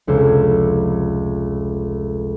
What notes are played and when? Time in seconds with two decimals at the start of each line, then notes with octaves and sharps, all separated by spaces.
0.07 F1 C#2 C5 C#5